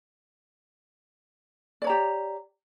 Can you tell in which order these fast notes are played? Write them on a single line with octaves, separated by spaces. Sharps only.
D5 C#5 A#5 G4